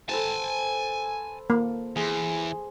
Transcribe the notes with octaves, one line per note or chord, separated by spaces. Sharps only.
A4 B4 C5 G#5 A5
A#3
E2 G#4 C6